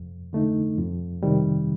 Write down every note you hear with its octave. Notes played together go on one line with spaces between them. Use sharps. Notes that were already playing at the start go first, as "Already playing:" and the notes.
Already playing: F2
D3 A3 D#4
F2
C3 D#3 G3